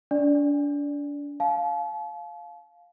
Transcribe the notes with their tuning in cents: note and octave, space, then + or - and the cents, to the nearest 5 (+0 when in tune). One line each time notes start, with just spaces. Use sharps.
D4 -35 D5 +0
F5 +5 A5 -40